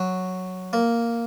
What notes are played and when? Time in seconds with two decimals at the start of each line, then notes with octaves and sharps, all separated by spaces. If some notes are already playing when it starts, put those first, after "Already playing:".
Already playing: F#3
0.73 A#3